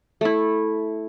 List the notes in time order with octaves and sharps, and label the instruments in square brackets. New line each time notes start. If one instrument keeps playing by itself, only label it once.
[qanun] A3 E4